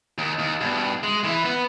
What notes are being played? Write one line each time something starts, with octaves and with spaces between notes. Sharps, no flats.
D#2
D#2
G2 B2
G#3
E3 E4
B3 B4